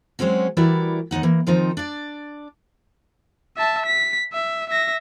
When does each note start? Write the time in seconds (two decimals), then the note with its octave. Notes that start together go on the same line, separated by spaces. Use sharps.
0.19 F#3 G#3 C4 C#4 F#4
0.57 E3 G3 E4 F#4 A#4 D5
1.11 D#2 D3 D#4 F#5
1.23 E3 A#3
1.47 D#3 F3 C4 D#4
1.77 D4 D5
3.57 E5 A5
3.86 B6
4.33 E5
4.70 E5 A#6